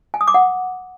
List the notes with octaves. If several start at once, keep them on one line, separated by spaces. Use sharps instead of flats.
G#5
D#6
D6
F#5